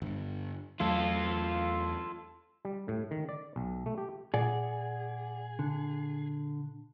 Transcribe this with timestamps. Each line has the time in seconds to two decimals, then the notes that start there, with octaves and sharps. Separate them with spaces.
0.02 G1
0.80 E2 F#3 A3 F4 A4
2.65 G3
2.88 A2
3.11 D#3
3.29 D5
3.56 B1
3.86 A3
3.98 G4
4.34 A#2 G#4 D5 F#5
5.59 D3